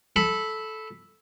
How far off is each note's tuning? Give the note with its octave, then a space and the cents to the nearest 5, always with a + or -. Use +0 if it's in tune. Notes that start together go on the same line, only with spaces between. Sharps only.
A4 -10 B5 +0